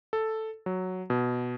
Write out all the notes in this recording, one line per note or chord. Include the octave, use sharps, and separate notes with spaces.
A4
F#3
B2